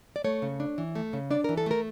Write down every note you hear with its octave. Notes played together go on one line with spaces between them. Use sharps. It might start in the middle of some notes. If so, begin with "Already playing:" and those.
D5
A3 C#5
C#3
D4
E3
A3
C#3
D4 D5
A#4
E3
A4
A3 A#4